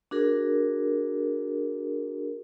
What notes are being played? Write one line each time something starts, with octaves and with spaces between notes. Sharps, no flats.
D4 F#4 G#4 A#4